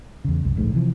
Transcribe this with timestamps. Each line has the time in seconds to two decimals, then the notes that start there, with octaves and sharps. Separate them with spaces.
0.25 E2 C#3
0.45 C2 F#2
0.56 D1 A#1 G#2 A3
0.73 C3 E3 F3